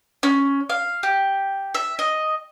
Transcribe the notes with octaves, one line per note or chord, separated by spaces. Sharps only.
C#4
F5
G4
E5
D#5